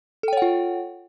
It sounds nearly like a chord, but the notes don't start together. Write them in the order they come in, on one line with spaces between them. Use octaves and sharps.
A4 G5 C#5 F#5 F4